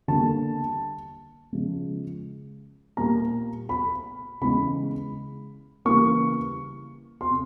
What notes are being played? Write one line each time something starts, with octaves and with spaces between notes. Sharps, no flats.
D3 G3 A#3 A5
C#3 F3 G#3
A#2 G3 A#3 A#5
B5
C#3 E3 G#3 B5
C#3 E3 G3 A#3 C#6
C6
C3